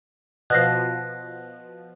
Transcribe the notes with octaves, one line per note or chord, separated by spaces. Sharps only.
B2 F3 F#6 A#6 C7